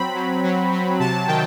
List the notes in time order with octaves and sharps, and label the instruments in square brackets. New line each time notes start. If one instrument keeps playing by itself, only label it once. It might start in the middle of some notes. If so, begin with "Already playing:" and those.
Already playing: [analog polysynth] F#3 C4 B5
F#3
F#3
F#3
C3 A5
D#3 G5